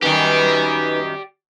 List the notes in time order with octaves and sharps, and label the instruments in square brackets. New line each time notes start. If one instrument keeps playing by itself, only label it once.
[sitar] F#2 D#3 [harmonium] D#4 B4 G#5 [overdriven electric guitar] G4 D5